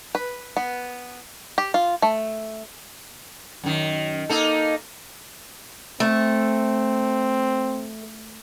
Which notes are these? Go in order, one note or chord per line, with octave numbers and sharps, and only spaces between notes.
B4
B3
G4
F4
A3
F#2 D#3
A#3 D#4 A4
A3 C4